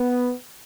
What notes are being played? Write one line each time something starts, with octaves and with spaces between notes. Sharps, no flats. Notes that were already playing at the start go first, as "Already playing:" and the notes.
Already playing: B3